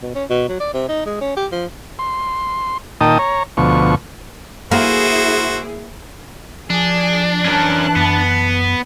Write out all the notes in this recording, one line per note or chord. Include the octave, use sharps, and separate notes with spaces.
B2
C#4
B2
F#3
D5
C3
D#4
G#3
C#4
G4
F3
C6
A#2 D#3 D#4 G5 A5 D#6
C#5 A#5
D2 B2 F3 C#6
A#3 E4 F#4 G#4 C5
F3 D4 G#4
E3 C#4 A#4 A5 F#6
F#2 B3